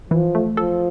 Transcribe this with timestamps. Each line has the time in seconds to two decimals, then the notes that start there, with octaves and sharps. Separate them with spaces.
0.10 E3 F3
0.35 A3
0.57 F3 A4